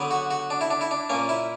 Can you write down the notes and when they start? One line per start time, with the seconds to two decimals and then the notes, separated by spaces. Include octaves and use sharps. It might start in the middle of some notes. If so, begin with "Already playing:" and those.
Already playing: D3 F#3 B3
0.11 F#4
0.31 F#4
0.50 D4
0.61 E4
0.71 D4
0.81 E4
0.91 D4
1.09 A#2 A#3 C#4
1.29 E4